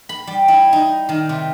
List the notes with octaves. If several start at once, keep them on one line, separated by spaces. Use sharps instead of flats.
B5
G3
E4
D#4
D#3
C3